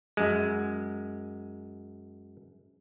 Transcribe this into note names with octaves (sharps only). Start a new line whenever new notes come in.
F#2 G#3